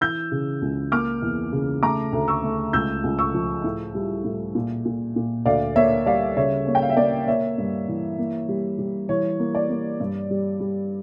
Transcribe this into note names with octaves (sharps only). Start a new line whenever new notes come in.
E3 E6 G6
C#3
C#2
A#3 D6 F6
E2
C#3
A3 A#5 D6
D2
C#6 E6
A3
C#2 E6 G6
C#2
C#6 E6
F3
A2
G3
A2
A#2
A#2
A#2
D2 D5 F5
A#3 C#5 E5
G3 D5 F5
C#3 C#5 E5
A#3 C#5
G5
F5
E5
A#3 D5
A#3 C#5 E5
G2
E3
A#3
G3
G3
E3 C#5
A#3
D5
A#3
G2
G3
G3